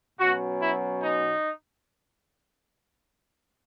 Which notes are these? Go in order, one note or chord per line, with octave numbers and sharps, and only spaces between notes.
B2 F#3 C#4 F#4
E4
D#4